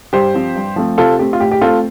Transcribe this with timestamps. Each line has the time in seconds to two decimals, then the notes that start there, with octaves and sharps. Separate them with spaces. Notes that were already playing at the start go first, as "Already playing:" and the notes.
0.13 G2 G4 C5
0.34 F3 C4
0.56 G2
0.76 F3 A3 C4
0.98 C3 F4 A4
1.19 A3 C4 G4
1.33 F4
1.41 A2 G4
1.51 G4
1.61 A3 C4 F4 A4